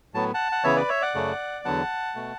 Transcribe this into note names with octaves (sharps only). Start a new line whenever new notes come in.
A2 F#3 B3 A5
F#5 A5
F#5
C#3 E3 B3 C#5 E5
B4 D5
C#5 E5
D5 F#5
F#2 C#3 F#3 A3
E2 D3 F#3 B3 F#5 A5
B2 A3